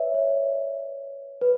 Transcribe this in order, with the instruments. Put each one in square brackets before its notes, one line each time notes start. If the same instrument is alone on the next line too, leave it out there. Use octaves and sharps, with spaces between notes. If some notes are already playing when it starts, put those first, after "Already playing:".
Already playing: [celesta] B4 C#5 D5 E5
C#5
B4